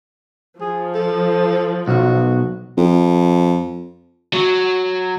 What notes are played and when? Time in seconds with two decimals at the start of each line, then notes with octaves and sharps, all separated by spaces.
0.61 F3 G#4
0.95 A4
1.88 B1 F#4
2.77 F2
4.34 F#3